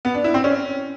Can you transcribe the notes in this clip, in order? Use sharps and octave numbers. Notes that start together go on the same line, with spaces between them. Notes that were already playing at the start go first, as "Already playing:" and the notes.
B3
D4
E4
C4
C#4